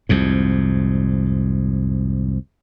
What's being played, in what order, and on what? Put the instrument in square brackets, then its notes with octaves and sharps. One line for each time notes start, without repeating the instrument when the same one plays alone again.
[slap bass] C2 F2 G#2